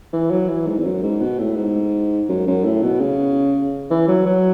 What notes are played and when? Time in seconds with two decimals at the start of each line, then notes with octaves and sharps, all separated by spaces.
0.13 E3
0.31 F#3
0.49 E3
0.67 G#2
0.78 E2
0.85 F#2
1.03 G#2
1.21 B2
1.39 A2
1.57 G#2
2.29 F#2
2.47 F#2
2.64 A2
2.83 B2
3.01 C#3
3.91 E3
4.08 F#3
4.26 F#3